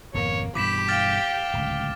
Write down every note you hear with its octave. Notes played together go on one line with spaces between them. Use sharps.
G#1 F2 B2 A#3 C#5
G2 B2 E3 G4 B5 D6 B6 E7
F5 G5 F6 A6
D1 C#2